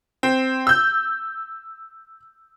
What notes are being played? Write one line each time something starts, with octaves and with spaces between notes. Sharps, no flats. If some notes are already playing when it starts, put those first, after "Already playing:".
C4
E6 G6